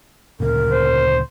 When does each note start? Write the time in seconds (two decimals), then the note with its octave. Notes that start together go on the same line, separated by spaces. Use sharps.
0.40 D2 A#2 C#3 A#4
0.71 C5